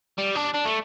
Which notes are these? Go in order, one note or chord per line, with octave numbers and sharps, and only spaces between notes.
G3
D4
D4
A3